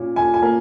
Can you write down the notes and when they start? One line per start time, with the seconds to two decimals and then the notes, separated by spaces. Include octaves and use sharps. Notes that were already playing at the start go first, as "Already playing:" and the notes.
Already playing: A#2 C#4
0.16 A#2 G#5
0.34 G#5
0.42 A#3